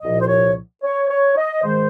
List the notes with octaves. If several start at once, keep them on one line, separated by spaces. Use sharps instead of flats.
C2 A#2 F3 D#5
C5
C#5
C#5
C#5
D#5
G#2 D#3 G#3 C5